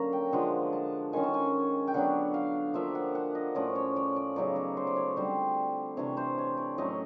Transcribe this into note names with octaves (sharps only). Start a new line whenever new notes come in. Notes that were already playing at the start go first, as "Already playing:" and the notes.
Already playing: D3 F#3 A#3 C#4 A#5
G5
D3 F3 G#3 F#5
A5
D#3 G#3 C#4 G#5
A5
G#5
G5
D3 F#3 B3 D4 F#5
F5
F3 A#3 D4 E5
F#5
F#5
D#5
A2 F3 A3 C#4 D5
C#5
D5
D5
C#3 F#3 B3 D#4 D5
D5
C5
D5
C#5
D3 G3 C4 C5
C3 E3 A3 D4 C#5
C5
C#5
D5
A2 F#3 A3 C#4 D#5